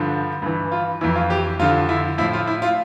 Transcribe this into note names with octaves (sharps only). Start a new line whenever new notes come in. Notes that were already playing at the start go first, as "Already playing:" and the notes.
Already playing: G2 D3 F3
G2 E3
F4
F2 E3 E4
F4
G4
F2 D3 F3 F4
E4
A2 F3 E4
F4
E4
F4